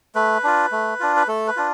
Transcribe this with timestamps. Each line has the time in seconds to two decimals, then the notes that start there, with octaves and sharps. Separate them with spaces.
0.15 A3 B4
0.44 D4 F4
0.72 A3
1.00 D4 F4
1.16 B4
1.28 A3 A4
1.47 B4
1.56 D4 F4